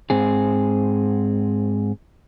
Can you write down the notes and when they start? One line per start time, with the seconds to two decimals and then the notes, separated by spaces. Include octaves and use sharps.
0.10 G#2 C4 G#4